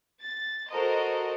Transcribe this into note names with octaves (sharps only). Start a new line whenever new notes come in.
A6
F#4 A4 A#4 C5 D#5